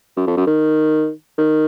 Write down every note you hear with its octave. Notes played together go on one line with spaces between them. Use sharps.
F#2
F2
F#2
D#3
D#3